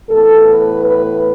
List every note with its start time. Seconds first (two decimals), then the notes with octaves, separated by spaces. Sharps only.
0.09 A2 E3 B3 A4
0.47 B4
0.84 B4